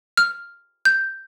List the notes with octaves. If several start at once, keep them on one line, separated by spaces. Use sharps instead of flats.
F6
G6